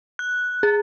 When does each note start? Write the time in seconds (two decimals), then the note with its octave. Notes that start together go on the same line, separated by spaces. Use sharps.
0.19 F#6
0.63 G#4